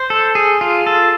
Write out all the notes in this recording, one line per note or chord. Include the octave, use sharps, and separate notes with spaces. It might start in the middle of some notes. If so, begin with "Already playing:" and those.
Already playing: C5
A4
G#4
F4
A4